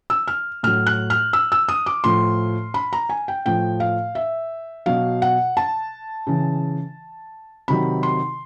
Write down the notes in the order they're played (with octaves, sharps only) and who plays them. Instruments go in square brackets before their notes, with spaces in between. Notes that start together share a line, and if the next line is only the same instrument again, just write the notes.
[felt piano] E6
F6
A2 F#3 F6
F#6
F6
E6
E6
D#6
D6
A2 F3 C6
B5
A#5
G#5
G5
A2 F3 G5
F5
E5
B2 F#3 F5
F#5
A5
C#3 E3
C3 D#3 F#3 B5
C6